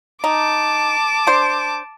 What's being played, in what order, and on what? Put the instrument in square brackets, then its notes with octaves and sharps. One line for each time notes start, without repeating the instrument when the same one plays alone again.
[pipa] D#4 [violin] A5 D6
[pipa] D4 C5